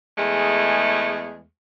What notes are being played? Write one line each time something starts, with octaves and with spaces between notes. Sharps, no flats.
E2 G#3 A3 G#4